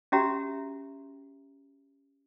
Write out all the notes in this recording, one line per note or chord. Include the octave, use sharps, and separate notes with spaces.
C#4 F#4 G4 E5 A#5